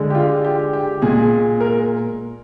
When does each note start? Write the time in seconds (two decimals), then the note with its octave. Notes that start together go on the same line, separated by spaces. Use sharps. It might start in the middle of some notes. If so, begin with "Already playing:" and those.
Already playing: D3 G#3
0.10 G4
0.15 F4
0.45 G4
0.73 G4
1.02 A#2 G#3 G#4
1.61 A#4